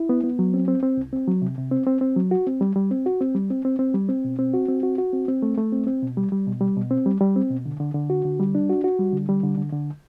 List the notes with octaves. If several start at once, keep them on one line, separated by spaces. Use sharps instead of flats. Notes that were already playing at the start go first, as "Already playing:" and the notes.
Already playing: E4
B3
B3
F#3
C4
C4
C4
C2
C4
F#3
C3
C3
C4
C4
C4
F#3
F#4
C4
G3
G3
C4
F#4
C4
G3
C4
C4
C4
G3
C4
B2
C4
F#4
C4
F#4
F#4
C4
C4
A3
A3
C4
C4
B2
G3
G3
B2
G3
B2
C4
G3
G3
C4
B2
D3
D3
D3
F#4
D3
G3
D4
F#4
F#4
G3
D3
G3
D3
D3
D3